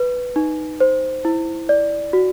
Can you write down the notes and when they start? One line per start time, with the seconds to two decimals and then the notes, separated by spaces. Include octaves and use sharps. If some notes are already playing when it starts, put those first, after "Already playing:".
Already playing: B4
0.36 D#4
0.80 C5
1.25 E4
1.69 D5
2.13 F#4